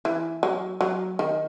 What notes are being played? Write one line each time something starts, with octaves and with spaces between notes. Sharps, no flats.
E3
F#3
F#3
D#3